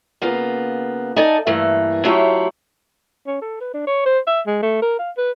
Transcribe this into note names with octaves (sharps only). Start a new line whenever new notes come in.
C#3 A#3 B3 F4
D#4 A4 D5 G#5
G2 E3 A3 A#3
F#3 A3 E4 F4 G4 C#5
C#4
A4
B4
D4
C#5
C5
E5
G#3
A3
A#4
F5
B4